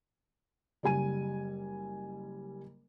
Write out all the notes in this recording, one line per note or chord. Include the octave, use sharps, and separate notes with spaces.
F#1 G3 G#5 D#7